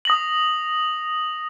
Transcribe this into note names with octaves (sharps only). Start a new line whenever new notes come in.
D#6 A#6 F#7